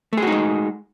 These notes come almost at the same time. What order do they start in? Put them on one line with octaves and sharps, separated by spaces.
A3 G#4 F#4 D#4 G#3